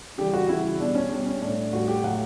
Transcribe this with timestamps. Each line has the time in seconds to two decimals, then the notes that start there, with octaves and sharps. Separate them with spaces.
0.18 C#3 E3 G3 G4
0.34 F#4
0.49 C#3 E3 G3 E4
0.80 B2 G3 D4
0.95 C#4
1.11 B2 G3 D4
1.26 C#4
1.41 A2 G3 D4
1.73 A2 G3 F#4
1.88 G4
2.03 A2 F#3 F#5